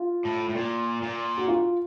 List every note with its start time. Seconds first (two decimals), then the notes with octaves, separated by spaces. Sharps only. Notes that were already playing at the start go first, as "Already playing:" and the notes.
Already playing: F4
0.25 A2
0.49 A2
0.55 A#2
1.02 A#2
1.38 F#4
1.48 F4